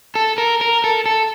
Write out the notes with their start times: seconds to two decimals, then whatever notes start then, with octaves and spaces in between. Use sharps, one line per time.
0.15 A4
0.38 A#4
0.61 A#4
0.84 A4
1.06 A4